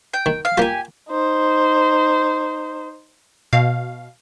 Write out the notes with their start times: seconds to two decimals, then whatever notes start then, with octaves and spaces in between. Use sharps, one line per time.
0.14 G5
0.26 D#3
0.45 F5
0.58 A#3 F4 G4 G#5
1.09 D#4 C5
3.53 B2 F5